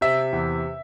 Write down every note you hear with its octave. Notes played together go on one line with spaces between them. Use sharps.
C3 E5
E2